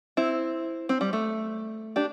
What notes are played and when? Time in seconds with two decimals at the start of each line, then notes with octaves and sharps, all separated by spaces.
0.17 C4 E4
0.89 C4
1.01 G3
1.13 A3
1.96 D4 G4